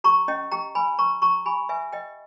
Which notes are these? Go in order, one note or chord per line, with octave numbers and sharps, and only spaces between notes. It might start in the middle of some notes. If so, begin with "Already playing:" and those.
G4 A#5 C#6
C#4 D#5 G5
G4 G5 A#5
B4 G#5 B5
B4 A#5 C#6
G4 A#5 C#6
G4 G#5 B5
B4 E5 G#5
B4 D#5 G5